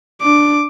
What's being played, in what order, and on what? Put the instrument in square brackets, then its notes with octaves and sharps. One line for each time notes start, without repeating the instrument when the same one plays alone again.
[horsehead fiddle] D4 [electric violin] D6